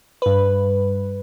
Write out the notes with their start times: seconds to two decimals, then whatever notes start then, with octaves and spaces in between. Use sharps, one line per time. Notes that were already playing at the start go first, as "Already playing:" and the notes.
0.22 G2 B4